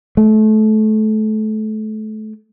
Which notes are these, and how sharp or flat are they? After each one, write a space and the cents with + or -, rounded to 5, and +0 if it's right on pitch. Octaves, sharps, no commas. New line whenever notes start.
A3 -25